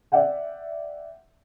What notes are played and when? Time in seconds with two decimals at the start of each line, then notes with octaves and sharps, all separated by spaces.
0.12 D5 E5 F#5 G5